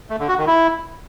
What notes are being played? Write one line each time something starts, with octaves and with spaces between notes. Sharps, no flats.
A3
D3
F#4
D#3
E4